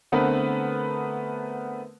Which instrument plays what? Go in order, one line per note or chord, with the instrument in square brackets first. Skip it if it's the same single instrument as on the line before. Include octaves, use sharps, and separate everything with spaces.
[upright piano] D3 A3 B3 C4 A#4 B4